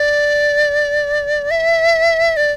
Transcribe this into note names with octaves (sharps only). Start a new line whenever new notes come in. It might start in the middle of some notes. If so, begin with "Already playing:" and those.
Already playing: D5
E5
D5